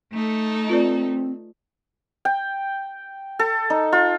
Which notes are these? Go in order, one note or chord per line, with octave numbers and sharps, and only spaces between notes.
A3 D#4 A4
C4 F4 B4 D5
G5
A4
D#4
F4